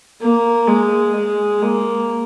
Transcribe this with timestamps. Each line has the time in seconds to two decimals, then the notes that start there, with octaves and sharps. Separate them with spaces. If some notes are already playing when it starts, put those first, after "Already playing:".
0.21 A#3
0.68 G#3
1.15 G#3
1.62 A#3